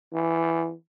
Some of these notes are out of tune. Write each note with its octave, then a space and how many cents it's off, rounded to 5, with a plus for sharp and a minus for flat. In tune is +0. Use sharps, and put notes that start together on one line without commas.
E3 +10